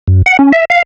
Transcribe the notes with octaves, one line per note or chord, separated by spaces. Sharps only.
F#2
F#5
C#4
E5
F5